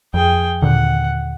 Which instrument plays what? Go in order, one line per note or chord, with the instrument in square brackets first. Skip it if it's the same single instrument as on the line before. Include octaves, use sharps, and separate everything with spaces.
[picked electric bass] F2 [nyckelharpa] G#4 G5
[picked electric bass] D#2 A#2 D3 [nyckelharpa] F#5